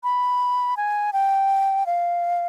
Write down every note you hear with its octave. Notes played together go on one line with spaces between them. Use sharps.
B5
G#5
G5
F5